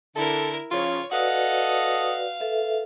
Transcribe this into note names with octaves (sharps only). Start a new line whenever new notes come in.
D3 E4 A4 A#4
C#3 F3 F4 C#5
F#4 A4 B4 D5 D#5 F5 F#5
A4 B4 E5